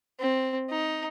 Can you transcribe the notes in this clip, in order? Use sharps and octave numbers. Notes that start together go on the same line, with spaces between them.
C4
D#4